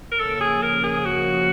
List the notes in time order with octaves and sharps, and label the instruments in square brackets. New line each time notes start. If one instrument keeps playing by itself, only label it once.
[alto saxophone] A#4
[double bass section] C#3 F3 A#3 C#4 [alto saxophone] A4
[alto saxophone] G#4
A#4
G#4
F#4